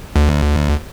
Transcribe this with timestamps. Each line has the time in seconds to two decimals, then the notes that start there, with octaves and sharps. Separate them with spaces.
0.16 D2